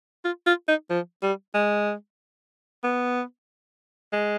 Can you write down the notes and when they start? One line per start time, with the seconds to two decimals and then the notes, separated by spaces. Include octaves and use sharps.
0.25 F4
0.46 F4
0.68 D#4
0.90 F3
1.22 G3
1.54 G#3
2.84 B3
4.13 G#3